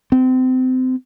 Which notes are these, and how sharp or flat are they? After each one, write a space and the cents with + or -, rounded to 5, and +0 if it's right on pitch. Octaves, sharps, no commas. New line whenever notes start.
C4 -30